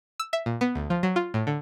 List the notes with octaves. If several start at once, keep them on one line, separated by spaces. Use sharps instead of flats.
E6
E5
A#2
B3
D2
F3
F#3
F4
A2
D3